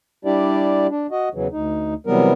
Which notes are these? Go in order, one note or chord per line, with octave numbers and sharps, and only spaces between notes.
G3 D4 E4 G4 D5
D4
F#4 D#5
E2 C#3 E3 F#3
D2 D#4
C3 E3 F#3 G3 B3 A#4